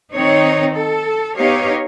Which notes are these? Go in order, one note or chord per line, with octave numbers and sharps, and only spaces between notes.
D#3 C4 D#4 C#5
A4
B3 D#4 G4 C#5 F5